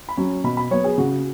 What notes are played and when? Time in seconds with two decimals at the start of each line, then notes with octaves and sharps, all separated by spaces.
0.09 B5
0.17 F#3 C#4
0.44 B2 B5
0.57 B5
0.71 F#3 B3 C#5
0.84 G#4
0.98 C#3 F#4